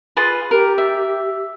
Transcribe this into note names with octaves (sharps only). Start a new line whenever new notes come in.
F4 G#4 B4
G4 A#4
E5